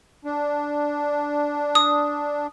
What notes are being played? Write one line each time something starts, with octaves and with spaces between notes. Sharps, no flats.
D4
D#6